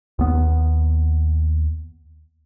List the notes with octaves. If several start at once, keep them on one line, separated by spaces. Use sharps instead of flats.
D#2 B3